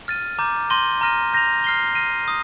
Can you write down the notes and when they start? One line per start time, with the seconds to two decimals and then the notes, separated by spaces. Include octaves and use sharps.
0.08 F6 A6 D#7
0.39 A#5 D6 G6
0.70 C6 G6 A#6 D#7 G7
1.01 A#5 F6 A#6 D#7
1.34 G6 A#6 F7
1.64 F6 C7 G7
1.95 F6 A#6 D#7
2.28 D#6